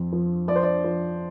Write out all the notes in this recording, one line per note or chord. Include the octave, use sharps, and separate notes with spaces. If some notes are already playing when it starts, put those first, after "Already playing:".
Already playing: F2 F3
F3
F3 D5
C5
D5
F3